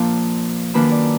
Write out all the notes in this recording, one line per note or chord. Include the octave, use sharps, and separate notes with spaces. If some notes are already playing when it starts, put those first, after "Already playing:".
Already playing: A#2 F3 A#3 D4 A#4
F#2 D#3 A#3 D4 B4
D5